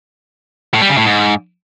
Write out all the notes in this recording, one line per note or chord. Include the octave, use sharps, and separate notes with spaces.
A2
G3
C#3
A2
G#2